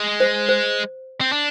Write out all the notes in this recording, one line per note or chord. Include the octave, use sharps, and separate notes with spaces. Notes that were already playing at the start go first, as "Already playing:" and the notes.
Already playing: G#3
C5
C5
C4
D4